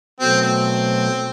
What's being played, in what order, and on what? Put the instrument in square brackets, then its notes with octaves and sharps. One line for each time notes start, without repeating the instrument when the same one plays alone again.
[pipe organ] B2 F#3 A3 [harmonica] C4
[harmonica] C4